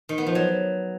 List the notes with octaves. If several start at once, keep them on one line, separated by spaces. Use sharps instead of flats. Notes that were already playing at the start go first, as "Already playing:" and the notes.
D#3
B3
F3
F#3